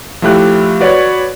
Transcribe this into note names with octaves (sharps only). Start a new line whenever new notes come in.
F3 A3 E4 G4 F#6
F#4 B4 C#5 D5